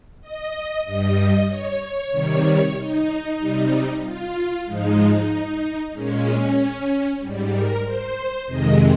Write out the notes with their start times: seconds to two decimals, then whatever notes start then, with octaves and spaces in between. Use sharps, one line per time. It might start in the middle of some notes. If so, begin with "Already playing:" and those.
0.21 D#5
0.85 G2 G3 D#5
1.48 C#5
1.80 C#5
2.11 C3 D#3 G3 C#5
2.76 D#4
3.39 C3 G3
4.02 F4
4.65 G#2 F3 G#3 D#4
5.92 A#2 G#3 C#4
7.19 G#2 G3
7.51 A#4
7.83 C5
8.46 F2 C3 D#3 G#3 D#5